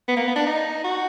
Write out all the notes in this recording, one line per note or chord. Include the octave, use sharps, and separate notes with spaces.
B3
A#3
B3
D4
D#4
F#4